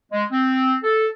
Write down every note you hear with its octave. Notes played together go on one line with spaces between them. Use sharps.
G#3
C4
A4